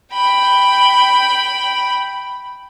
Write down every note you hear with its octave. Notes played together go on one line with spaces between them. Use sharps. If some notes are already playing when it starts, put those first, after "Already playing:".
G5 B5